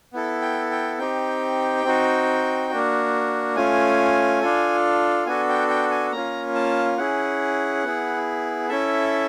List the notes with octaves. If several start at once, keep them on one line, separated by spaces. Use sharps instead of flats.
B3 E4 A4
G5
G5
C4 D#4 G4 G5
C4 D#4 F#4
A#3 D4 F#4
A3 C#4 F4 G#5
D4 F4 A4
B3 D4 F#4 A4 G#5
G5
G5
G#5
A#3 C#4 F4 A#5
A5
C#4 E4 G#4 F#5
B3 E4 G#4
C#4 E4 A4 E5